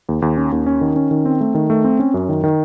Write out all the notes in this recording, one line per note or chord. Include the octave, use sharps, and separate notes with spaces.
D#2
D#2
C#4
D#2
C#4
D#3
C#4
D#3
C4
A3
D#3
A3
C4
C#4
F#2
D#3
D#3